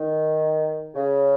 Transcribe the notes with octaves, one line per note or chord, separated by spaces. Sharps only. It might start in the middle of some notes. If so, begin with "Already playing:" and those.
Already playing: D#3
C#3